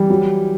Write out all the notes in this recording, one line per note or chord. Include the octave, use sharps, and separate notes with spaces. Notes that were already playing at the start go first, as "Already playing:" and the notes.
Already playing: E3 G3
F#3